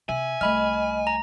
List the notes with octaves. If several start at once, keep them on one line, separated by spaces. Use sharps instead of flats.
C3 E5 G#5
C2 A3 D#5 B5 F6
A#5